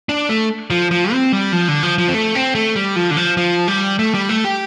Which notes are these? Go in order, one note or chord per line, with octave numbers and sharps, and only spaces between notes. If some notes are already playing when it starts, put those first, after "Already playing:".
D4
A3
F3
F3
C4
G3
F3
D3
F3
F3
C4
A3
C4
A3
G3
F3
D3
F3
F3
G3
A3
G3
A3
G4